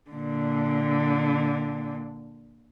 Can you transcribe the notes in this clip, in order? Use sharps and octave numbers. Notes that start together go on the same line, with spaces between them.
A#2 D3